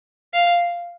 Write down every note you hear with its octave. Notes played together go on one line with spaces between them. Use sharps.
F5